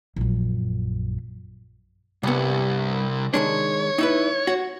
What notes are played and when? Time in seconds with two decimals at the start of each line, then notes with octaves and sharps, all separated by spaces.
0.16 A#1 F#2
2.23 C2 G2 B3
3.34 D#3 G#3 D4 C#5
3.98 D#4 E4 B4
4.47 F#4